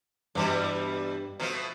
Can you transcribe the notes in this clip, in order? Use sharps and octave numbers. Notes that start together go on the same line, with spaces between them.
G2 B2 E3 G3
B2 F3 A3